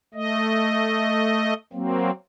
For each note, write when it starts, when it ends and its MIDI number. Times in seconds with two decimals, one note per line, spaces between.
0.14 1.54 57
0.14 1.54 75
1.73 2.11 54
1.73 2.11 58
1.73 2.11 60